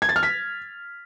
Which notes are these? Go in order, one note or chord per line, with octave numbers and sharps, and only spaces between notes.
G#6
A6
F6
B6